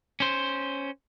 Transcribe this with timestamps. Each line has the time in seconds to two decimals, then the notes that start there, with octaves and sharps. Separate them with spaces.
0.20 C#4 C5